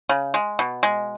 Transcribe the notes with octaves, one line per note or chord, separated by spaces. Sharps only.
C#3
G#3
B2
G#3